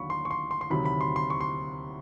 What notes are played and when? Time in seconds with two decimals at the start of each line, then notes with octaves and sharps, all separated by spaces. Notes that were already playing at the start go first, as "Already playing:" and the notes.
Already playing: D#2 D3 F#3 B5 C#6
0.10 C6
0.25 C#6
0.31 C6
0.51 C6
0.61 C6
0.70 D2 C3 D#3 F#3 B5
0.85 B5
1.01 C6
1.16 C6
1.30 C#6
1.41 C6